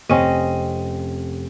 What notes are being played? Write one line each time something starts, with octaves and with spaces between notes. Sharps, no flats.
F1 C4 C#4 D#5 D#7